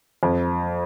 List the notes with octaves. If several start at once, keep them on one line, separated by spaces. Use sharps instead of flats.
F2